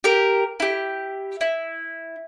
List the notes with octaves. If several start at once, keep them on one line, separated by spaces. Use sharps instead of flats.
G4 A#4
E4 G4
E4